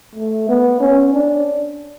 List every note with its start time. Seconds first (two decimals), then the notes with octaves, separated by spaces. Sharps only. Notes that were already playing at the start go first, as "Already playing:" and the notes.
0.16 A3
0.49 B3
0.81 C#4
1.14 D4